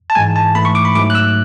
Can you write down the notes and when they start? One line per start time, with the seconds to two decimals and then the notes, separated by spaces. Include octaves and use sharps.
0.10 A5
0.15 G#2 E3 G#3 G#5
0.36 A5
0.55 G#2 E3 A3 B5
0.65 C#6
0.75 D6
0.85 B5
0.95 G#2 F#3 A3 D6
1.10 F#6
1.15 E6